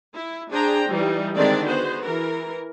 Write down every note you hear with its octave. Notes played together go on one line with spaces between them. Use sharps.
E4
D4 G#4 C5 G5 A#5
E3 G3 D#4
D3 D#3 G#3 C4 D4 D5
B3 F#4 G#4 C5
E3 A#4